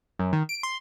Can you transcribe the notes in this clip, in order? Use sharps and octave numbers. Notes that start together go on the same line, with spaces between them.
F#2
D#3
D7
C6